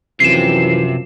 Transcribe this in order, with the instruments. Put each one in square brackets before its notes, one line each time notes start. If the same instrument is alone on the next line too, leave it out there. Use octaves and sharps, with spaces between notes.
[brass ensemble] F#2 F3 [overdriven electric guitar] C3 [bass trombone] E3 [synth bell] C7 E7